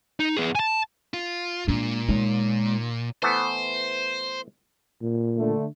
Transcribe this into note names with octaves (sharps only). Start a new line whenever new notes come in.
D#4
B3 G#4
G#5 A5
F4
A#2 G#3 D4
G#3 D#4 C#5
E3 A3 B3 C5
A#2
D3 A3